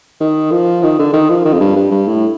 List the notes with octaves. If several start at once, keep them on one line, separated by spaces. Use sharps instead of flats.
D#3
F3
D#3
D3
D#3
F3
D#3
F2
G2
G2
G2
A2